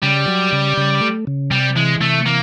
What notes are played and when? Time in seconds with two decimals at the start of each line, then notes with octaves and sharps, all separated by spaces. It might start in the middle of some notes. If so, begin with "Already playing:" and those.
0.03 C#3 G3
0.28 F#3
0.52 C#3
0.78 C#3
1.01 A3
1.27 C#3
1.51 C3 G3
1.76 E3 G#3
2.00 C3 A3
2.26 E3 A#3